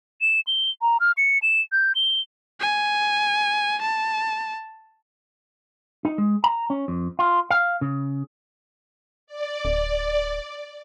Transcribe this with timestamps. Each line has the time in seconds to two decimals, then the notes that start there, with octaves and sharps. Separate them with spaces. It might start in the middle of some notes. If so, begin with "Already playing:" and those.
0.21 E7
0.47 G7
0.82 A#5
1.00 F6
1.17 C#7
1.42 E7
1.72 G6
1.95 G7
2.61 G#5
3.82 A5
6.05 D#4
6.18 G#3
6.44 A#5
6.70 C#4
6.88 F2
7.19 F4
7.50 F5
7.81 C#3
9.27 D5
9.65 D1